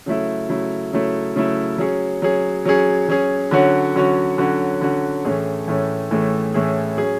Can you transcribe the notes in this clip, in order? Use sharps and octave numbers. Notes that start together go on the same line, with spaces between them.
C#3 F#3 A3 E4
C#3 F#3 A3 E4
C#3 F#3 A3 E4
C#3 F#3 A3 E4
F#3 C#4 G#4
F#3 C#4 G#4
F#3 C#4 G#4
F#3 C#4 G#4
D3 F#3 C#4 F#4
D3 F#3 C#4 F#4
D3 F#3 C#4 F#4
D3 F#3 C#4 F#4
A2 E3 A3 C#4 G#4
A2 E3 A3 C#4 G#4
A2 E3 A3 C#4 G#4
A2 E3 A3 C#4 G#4
F#3 C#4 G#4